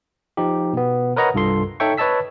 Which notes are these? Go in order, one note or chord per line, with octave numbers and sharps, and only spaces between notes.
F3 D#4 G4
B2 B3
A#4 B4 C#5 D#5 F#5 A#5
C2 G2 F4 A4 C6
D#4 A4 C#5 E5 G5 C#6
B4 C#5 D#5 A5 E6 B6